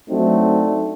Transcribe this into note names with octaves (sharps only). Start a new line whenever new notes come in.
F#3 A3 C4 D4 D#4 F#4